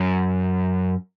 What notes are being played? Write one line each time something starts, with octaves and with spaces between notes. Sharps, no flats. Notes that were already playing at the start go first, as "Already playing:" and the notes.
Already playing: F#2